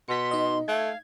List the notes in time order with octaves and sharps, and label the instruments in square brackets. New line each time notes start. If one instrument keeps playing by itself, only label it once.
[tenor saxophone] B2 [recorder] C6 [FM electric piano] B6 C#7
[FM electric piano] D#4 D#5
[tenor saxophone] A3 [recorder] F5 [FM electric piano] G#6